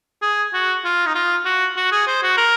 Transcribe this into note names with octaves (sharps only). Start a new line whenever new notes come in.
G#4
F#4
F4
D#4
F4
F#4
F#4
G#4
C5
F#4
A#4